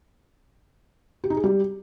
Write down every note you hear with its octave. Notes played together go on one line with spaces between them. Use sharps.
G4
D#4
G#4
G3